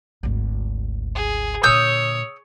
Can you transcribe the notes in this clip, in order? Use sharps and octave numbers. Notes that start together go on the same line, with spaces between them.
G#1 D2
G#4
A#2 D3 C#5 D#6 E6 G6